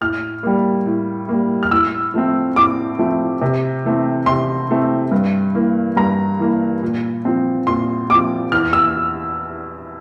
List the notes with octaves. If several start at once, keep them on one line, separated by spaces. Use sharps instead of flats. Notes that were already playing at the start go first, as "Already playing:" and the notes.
A2 F6
G3 A#3
A2
G3 A#3
F6
A2 E6
F3 A3 C4
A2 D6
F3 A3 C4
C3
E3 A3 C4
C3 C6
E3 A3 C4
G2
E3 A#3
G2 A#5
E3 A#3
A#2
F3 C4
A#2 C6
F3 C4 D6
E2 F6
E6